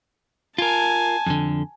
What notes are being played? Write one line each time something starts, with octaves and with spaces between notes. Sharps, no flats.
F4 A#4 G#5 A5
F2 D3